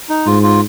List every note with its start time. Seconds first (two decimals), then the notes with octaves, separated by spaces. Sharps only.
0.09 D#4
0.26 G#2 F4
0.43 F4